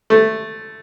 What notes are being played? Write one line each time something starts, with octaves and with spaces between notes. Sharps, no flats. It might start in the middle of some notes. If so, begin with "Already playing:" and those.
A3